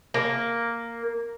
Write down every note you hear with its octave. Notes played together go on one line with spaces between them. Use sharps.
A#3